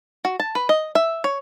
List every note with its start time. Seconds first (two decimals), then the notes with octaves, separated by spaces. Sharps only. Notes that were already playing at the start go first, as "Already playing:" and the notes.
0.25 F#4
0.40 A5
0.55 B4
0.69 D#5
0.95 E5
1.24 C#5